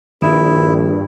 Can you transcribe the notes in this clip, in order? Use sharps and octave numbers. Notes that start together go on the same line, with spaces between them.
A#1 G2 D#3 E4